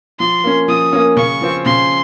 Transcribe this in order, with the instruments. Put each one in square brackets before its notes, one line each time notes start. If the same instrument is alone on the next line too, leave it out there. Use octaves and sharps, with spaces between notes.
[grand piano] F3 [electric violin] C6
[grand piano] A#3 C#4
[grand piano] F3 [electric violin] D#6
[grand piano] A#3 C#4
[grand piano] C#3 [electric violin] C#6
[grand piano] F3 C4
[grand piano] C#3 [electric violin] C6